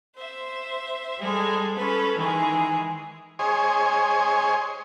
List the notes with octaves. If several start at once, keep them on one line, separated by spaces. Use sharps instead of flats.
C5 E5
G3 G#3 A4
C#4 A4 B4
D#3 E3 G#3 G#4
G#4 C5 C#5 D#5 G#5